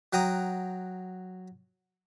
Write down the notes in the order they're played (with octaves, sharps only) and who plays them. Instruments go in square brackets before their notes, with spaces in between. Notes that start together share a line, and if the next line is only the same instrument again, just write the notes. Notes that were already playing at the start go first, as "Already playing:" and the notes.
[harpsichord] F#3 F#5 G5 A#5 D#6